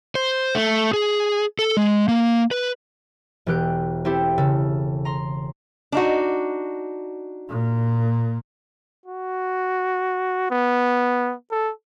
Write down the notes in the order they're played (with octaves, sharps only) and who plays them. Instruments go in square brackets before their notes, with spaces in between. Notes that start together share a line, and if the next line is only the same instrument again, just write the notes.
[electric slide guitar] C5
A3
G#4
A4
G#3
A#3
B4
[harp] E1 E3 G4 F#6 D7
C4 E4 G4 A4
C#3 A4
A#5 C6
[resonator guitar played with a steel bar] D4 D#4 F#4
[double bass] A#2
[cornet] F#4
B3
A4